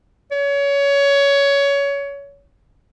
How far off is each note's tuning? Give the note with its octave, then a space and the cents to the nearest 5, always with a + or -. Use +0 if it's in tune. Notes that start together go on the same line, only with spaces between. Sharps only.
C#5 +20